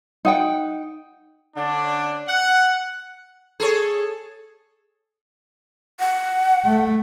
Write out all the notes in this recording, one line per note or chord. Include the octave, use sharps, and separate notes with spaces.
D#4 F#5 G5
D3 A3 C#4 D4
F#5
G#4 A4 C#5
F#5
A3